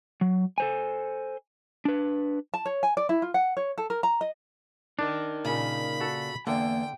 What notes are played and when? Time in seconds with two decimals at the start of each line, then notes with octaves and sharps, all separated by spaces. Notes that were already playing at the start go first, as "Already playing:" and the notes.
0.21 F#3
0.58 A4 C5 G#5
1.85 D4 B4
2.54 A5
2.66 C#5
2.83 G#5
2.97 D5
3.09 E4
3.22 F4
3.34 F#5
3.57 C#5
3.78 A4
3.90 A#4
4.03 A#5
4.21 D#5
4.99 D4 D#4 A#4 D#5
5.45 A#2 C#3 B5
6.00 F#4 A4
6.47 E2 D3 A#3 G5